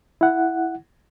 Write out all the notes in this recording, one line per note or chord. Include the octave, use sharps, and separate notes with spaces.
E4 F#5